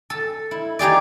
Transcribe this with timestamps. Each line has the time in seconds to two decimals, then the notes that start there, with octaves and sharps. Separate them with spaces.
0.10 A4
0.51 E4
0.79 D#4 G4 G#4 D5